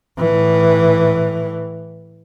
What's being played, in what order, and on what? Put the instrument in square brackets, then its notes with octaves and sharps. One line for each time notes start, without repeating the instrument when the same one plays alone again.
[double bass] A2 E3